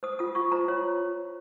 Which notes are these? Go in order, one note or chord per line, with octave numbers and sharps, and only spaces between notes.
C5 D#6
F4 D#6
F4 C#6
C5 A#5
F4 C#5